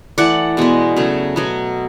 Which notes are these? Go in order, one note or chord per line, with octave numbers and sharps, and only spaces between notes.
E3 A3 D5 F#5
B2 G#3 B3
C#3 F#3 A3
B2 F#3 B3